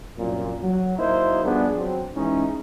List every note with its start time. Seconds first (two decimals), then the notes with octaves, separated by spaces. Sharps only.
0.17 C2 F#2 A#2
0.62 F#3
0.99 F#3 A#3 D#4 E4 A#4 C5
1.45 F3 G3 B3 D4 G#4
1.77 F#3 C4
2.15 E3 G#3 C#4 D#4